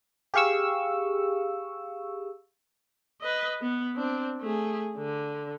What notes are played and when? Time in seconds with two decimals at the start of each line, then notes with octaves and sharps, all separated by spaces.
0.34 G4 G#4 F5 C#6 E6
3.22 B4 D#5
3.62 B3
3.96 C4 D4
4.41 A3 G#4
4.98 D3